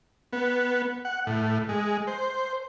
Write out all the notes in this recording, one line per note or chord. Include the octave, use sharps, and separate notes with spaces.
B3
F#5
A2
G#3
C5